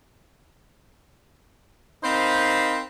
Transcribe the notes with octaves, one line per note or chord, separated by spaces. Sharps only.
C4 D#4 A#4 C5 F5 B5